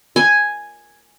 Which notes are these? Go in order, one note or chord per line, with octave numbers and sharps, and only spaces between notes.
G#5